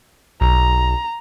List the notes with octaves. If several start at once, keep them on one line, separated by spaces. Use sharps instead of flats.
B1 A#5